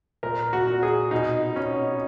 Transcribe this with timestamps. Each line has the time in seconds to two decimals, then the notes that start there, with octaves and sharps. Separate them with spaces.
0.23 A#2 A#4
0.53 F#4
0.67 A#2
0.83 G#4
1.11 B2 D#4
1.56 B2 C#4